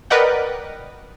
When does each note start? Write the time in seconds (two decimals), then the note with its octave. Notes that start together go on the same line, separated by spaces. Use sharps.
0.10 A#4 B4 D5 D#5 F#5 G5